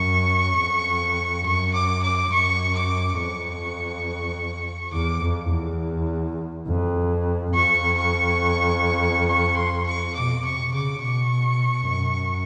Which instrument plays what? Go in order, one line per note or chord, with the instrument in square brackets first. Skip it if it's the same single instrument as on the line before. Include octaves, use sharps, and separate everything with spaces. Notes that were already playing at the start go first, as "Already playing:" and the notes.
Already playing: [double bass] F#2 [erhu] C#6
[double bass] F2
[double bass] F#2 [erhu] C#6
[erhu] D6
D6
[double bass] F#2 [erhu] C#6
[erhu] D6
[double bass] F2 [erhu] C#6
[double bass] E2 [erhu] D6
[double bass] F2
E2
F2
[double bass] F2 [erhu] C#6
[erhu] C#6
C#6
C6
C#6
[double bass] B2 [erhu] D6
[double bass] C3 [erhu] C#6
[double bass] C#3 [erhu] D6
[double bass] B2 [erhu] C#6
[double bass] F#2